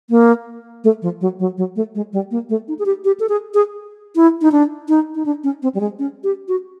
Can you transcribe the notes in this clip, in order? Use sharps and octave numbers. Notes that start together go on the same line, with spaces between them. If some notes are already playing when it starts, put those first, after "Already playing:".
A#3
A3
F3
F#3
F#3
F#3
A3
G#3
G3
A#3
A3
D#4
G#4
G4
G4
A4
G#4
G#4
E4
D#4
D4
D#4
D#4
D4
C#4
C4
G3
G#3
C#4
G4
F#4